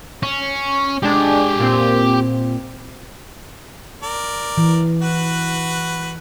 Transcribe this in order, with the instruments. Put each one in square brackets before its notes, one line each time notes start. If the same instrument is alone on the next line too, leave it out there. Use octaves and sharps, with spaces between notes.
[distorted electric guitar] C#4
[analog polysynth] G#3 D4 [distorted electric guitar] G4 G#5
[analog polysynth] A#2 C4
[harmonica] A#4 D5
[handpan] E3
[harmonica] F#4 B4